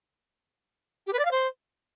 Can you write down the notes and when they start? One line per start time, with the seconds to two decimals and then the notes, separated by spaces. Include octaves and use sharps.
1.06 G4
1.13 B4
1.19 D5
1.25 F5
1.31 C5